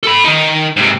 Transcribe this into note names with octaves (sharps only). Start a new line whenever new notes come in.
A4 B5
D#3 D#4
G#2 C3